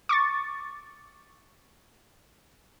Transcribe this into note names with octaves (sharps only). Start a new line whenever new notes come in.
C#6 D6 A6